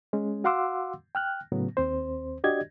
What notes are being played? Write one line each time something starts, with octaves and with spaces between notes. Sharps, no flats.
G#3 C#4
F#4 F5 F#5 C6 D6 E6
G5 F6 F#6
A2 C#3 F#3 B3
D#2 C4 C5
D4 F#4 G4 D5 D#5 G#6